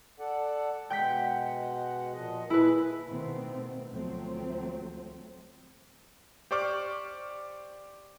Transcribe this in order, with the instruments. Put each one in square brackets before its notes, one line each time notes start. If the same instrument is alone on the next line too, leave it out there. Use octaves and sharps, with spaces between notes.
[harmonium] A4 D5 F#5
[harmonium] B2 G#3 F#5 [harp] G5 G6 B6
[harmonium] A#2 F3 D#5
[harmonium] A#2 G#4 [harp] E4 B4
[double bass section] B2 D#3 A3 B3 C4
D2 F3 F#3 A3 C4
[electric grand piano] G4 C5 D5 C#6 D6 F6